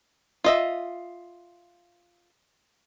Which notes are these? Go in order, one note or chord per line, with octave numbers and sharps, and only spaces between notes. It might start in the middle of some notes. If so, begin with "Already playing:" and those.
F4 D#5 E5